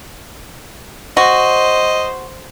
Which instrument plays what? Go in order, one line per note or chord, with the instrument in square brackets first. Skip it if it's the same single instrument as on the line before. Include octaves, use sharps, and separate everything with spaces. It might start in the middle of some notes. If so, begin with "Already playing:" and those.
[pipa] F#4 [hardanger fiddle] C5 [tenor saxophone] D#5